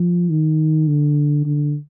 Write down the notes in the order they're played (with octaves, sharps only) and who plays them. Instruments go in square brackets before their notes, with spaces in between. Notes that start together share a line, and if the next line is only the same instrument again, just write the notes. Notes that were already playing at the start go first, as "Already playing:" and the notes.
Already playing: [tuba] F3
D#3
D3
D3